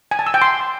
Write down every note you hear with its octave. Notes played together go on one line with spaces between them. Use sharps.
G#5
A5
E6
G5
C6